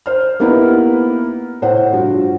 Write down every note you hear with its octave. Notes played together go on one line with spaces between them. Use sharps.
C5 F6
A#3 B3 D#4 E4 G4 B4
A2 C5 F#5
G2 F3 F#4